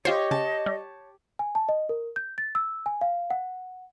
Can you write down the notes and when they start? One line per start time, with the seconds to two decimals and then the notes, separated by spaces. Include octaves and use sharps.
0.05 F4 G4 C5 C#5 D#5
0.31 C#3 A5
0.66 G3
1.39 G#5
1.55 A5
1.69 D#5
1.89 A#4
2.16 G6
2.38 A6
2.55 E6
2.86 G#5
3.01 F5
3.30 F#5